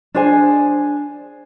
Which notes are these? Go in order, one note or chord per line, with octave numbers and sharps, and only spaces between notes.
D4 G#4 C5 G#5